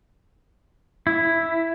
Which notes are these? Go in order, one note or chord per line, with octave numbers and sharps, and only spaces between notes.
E4